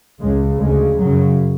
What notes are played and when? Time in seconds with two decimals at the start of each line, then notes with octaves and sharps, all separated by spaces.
0.20 C#2 C#3 G#3
0.60 D2 C#3 G#3
0.99 F#2 C#3 F#3